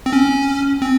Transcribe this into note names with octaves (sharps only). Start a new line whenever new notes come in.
C4
C#4
C4